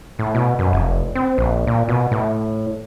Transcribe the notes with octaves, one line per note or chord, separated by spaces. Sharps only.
A2
B2
F#2
F1
C4
A#1
A#2
B2
A2